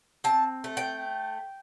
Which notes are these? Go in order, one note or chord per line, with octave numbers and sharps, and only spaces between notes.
C4 A5
A3
G5